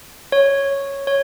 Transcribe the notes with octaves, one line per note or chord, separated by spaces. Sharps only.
C#5
C#5